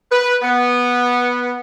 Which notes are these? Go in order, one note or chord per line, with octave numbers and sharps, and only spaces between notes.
B4
B3